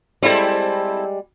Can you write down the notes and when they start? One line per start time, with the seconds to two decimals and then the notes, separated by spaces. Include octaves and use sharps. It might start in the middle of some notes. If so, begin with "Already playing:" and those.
0.23 G3 G#3 C4 E4 A4